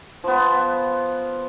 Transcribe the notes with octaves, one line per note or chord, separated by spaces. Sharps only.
F3 B3